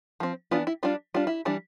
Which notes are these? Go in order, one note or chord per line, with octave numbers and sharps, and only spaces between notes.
F3 C4
E3 B3 D4 F4
E4
G3 D4 F4
G3 D4 F4
E4
E3 G3 D4